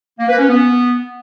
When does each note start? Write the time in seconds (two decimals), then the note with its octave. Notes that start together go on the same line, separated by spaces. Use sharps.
0.19 A#3
0.29 B4
0.38 C#4
0.48 B3